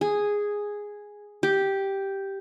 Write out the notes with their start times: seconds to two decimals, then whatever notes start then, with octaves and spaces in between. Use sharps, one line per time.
0.01 G#4
1.43 G4